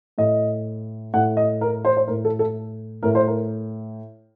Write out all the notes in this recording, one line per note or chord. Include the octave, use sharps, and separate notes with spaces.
A2 D#5
A2 F#5
D#5
A#4
C5
C5
A2 A#4
A4
A4
A2 A#4
C5
A#4